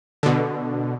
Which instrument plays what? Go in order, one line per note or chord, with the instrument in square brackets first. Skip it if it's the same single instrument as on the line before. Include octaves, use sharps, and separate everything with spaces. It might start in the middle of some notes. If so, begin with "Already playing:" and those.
[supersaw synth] B2 D3